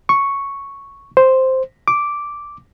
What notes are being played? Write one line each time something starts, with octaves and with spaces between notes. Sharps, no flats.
C#6
C5
D6